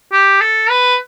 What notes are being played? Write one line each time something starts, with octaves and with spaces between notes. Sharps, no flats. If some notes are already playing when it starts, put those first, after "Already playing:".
G4
A4
B4